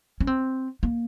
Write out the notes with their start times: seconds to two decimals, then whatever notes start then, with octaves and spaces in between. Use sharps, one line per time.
0.20 C#4
0.27 C4
0.83 A#3